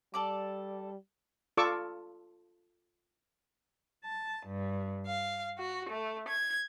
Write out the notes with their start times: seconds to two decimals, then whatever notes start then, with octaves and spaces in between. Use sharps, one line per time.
0.14 G3 A4 D5 D6
1.57 F4 A4 D5 C#6 D6 E6
4.05 A5
4.46 G2
5.06 F5
5.58 F#4
5.89 A3
6.28 G#6